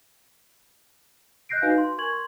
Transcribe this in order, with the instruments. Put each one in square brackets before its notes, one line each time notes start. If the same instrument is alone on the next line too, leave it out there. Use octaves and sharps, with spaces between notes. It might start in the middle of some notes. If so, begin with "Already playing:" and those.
[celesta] D#5 F#6 G6 A#6 C7 D7
D#4 F#4 B4 F5 G#5
C6
A#4 G#5 C#6 G#6 F#7
C6